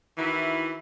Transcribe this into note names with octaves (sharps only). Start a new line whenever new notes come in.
D#3 E3 E4 F#4